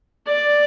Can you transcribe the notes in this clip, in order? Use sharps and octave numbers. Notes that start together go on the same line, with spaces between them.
D5